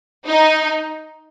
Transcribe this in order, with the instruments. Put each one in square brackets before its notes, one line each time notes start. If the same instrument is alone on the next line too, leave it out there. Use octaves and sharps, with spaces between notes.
[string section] D#4